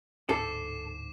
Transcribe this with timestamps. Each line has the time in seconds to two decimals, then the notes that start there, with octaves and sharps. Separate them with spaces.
0.29 D1 G#2 A4 D6 C7 E7